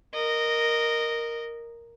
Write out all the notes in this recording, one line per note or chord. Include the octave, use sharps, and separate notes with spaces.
A#4 D#5